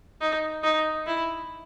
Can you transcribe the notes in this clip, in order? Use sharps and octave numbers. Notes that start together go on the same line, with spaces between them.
D#4
D#4
E4